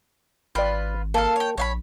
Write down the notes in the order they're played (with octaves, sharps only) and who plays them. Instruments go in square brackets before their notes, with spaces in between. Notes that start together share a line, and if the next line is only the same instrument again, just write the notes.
[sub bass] G#1 [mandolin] F4 B4 [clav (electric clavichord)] D5 G5
[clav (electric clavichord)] A#3 [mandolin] A4 F5
[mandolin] C#5 G5
[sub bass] A#1 [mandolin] C#5 F5 B5